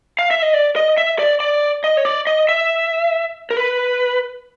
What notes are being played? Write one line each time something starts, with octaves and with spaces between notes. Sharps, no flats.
F5
E5
D#5
D5
D#5
E5
D5
D5
D#5
C#5
D5
D#5
E5
A#4
B4